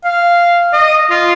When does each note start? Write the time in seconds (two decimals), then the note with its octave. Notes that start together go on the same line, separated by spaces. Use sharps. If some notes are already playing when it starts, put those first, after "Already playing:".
0.04 F5
0.73 D#5
1.10 F4